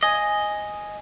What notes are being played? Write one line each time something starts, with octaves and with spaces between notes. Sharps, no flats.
D#5 G#5